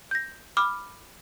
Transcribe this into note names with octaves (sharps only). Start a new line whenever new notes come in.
G6 A#6
B5 D6 F6